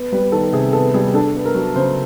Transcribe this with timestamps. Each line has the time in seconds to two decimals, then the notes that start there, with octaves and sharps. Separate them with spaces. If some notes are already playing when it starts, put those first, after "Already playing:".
Already playing: B3
0.12 G3 B4
0.32 D#3 A4
0.53 C3 G#4
0.73 B3 A4
0.94 G3 G#4
1.14 D4 A4
1.35 B3
1.45 A#4
1.55 F#3
1.76 C#3 C5